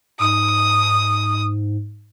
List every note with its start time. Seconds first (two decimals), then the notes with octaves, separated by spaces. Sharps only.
0.19 G#2 D#6